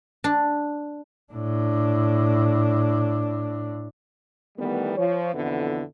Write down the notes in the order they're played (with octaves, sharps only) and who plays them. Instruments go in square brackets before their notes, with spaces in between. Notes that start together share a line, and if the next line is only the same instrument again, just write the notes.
[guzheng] D4
[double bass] A2 D4
[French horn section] D#3 E3 G3 A3 B3
F3 C#5
F2 B2 D3 E3 B3 E4